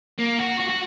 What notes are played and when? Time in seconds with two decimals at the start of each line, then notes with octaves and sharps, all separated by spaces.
0.18 A#3
0.39 F#4
0.59 F#4
0.69 F#4